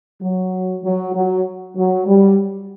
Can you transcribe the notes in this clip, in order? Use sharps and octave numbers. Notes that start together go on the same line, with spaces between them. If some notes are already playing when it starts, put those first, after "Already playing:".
F#3
F#3
F#3
F#3
G3